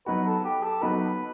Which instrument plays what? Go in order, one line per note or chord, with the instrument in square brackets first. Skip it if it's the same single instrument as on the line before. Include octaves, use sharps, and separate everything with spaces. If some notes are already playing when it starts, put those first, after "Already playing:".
[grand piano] F#3 B3 D#4 F#4 [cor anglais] B4
[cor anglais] A4
G4
A4
[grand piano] F#3 B3 D#4 F#4 [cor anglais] B4